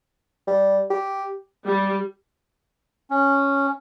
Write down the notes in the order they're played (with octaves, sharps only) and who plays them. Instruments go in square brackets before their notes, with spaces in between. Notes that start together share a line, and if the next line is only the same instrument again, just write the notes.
[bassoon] G3
G4
[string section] G3
[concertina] C#4